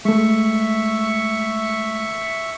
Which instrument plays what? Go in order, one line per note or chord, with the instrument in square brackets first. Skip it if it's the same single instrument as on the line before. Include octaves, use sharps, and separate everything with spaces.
[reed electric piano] G#3 A3 [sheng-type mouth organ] E5 C#6